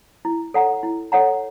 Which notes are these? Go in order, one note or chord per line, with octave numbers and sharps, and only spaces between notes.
E4
A4 C#5 F#5 A#5
E4
A4 C#5 F#5 A#5